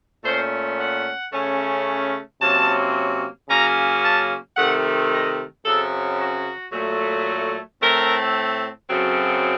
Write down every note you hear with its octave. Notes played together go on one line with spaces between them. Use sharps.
A#2 A3 C#4 C5
F#5
C#3 A3 C#4
C3 F#3 A#3 C#4 A5
C#3 F#3 A#3 C#4 A#5
A5
C3 D#3 A3 F#5
D#5
F#2 C#3 F#3 C4 A4
F#4
A#2 F#3 A3
A2 A3 C4 A#4
F#2 C#3 F#3 C4 A4